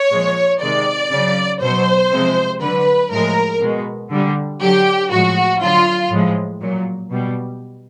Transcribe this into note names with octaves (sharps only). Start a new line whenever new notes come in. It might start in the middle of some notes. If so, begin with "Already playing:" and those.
Already playing: C#5
A#2 F3 G#3
C3 D#3 G#3 D5
C#3 F#3
B2 F#3 C5
C3 F3 G#3
D3 F#3 B4
A2 F3 G#3 A#4
B2 G#3
D3 G3
D3 F#3 G4
A2 F3 G#3 F#4
D3 F#3 F4
A2 F3 G#3
A#2 F#3
B2 G3